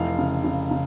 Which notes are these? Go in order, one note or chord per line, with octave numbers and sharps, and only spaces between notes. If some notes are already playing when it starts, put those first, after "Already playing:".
Already playing: F1 E3 F5
C#3
C#3
C#3